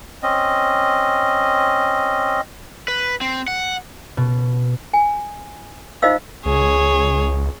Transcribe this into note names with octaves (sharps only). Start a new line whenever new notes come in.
C4 C#4 D#5
B4
C4
F#5
B2
G#5
D#4 F4 C5 D#5 F5 E6
C#2 G#4 C#5